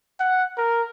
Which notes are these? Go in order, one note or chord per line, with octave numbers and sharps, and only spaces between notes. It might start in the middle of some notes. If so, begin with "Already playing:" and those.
F#5
A#4